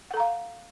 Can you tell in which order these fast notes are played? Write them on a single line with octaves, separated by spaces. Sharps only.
F#5 A4 A#5 F5